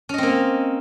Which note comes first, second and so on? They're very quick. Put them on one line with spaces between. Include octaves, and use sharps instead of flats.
C#4 D#5 C4 A#3